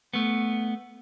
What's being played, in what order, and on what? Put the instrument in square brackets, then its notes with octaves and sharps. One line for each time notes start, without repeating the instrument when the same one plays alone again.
[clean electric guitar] A3 B3